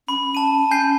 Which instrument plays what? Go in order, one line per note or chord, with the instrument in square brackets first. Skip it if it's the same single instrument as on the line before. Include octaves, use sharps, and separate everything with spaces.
[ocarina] C#4 [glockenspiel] B5
[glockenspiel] A5 D#7
G#5 G6 C7